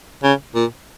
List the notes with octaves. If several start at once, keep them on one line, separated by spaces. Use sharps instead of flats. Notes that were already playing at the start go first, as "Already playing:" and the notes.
C#3
A#2